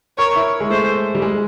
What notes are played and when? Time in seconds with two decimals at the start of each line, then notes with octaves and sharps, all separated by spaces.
0.18 A#4 C#5
0.36 E4
0.60 G#3
0.70 A3 C5
1.15 G3
1.22 G#3